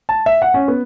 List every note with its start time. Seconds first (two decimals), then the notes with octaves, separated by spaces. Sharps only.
0.09 A5
0.26 E5
0.42 F#5
0.54 C#4
0.68 B3